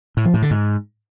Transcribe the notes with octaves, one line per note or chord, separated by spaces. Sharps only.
A2
F3
A2
D3
G#2